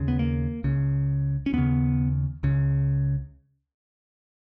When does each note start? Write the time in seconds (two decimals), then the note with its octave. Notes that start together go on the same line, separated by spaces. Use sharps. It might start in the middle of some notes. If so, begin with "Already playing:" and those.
Already playing: D#2 C#3
0.08 B3
0.19 A#3
0.64 C#2 C#3
1.46 C#4
1.53 D#2 C#3 B3
2.43 C#2 C#3